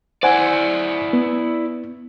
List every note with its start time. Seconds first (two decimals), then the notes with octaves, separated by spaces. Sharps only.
0.23 E4 C5 D5 F#5 G#5
1.13 B3